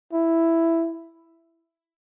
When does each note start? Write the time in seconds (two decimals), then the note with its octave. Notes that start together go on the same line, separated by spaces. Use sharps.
0.13 E4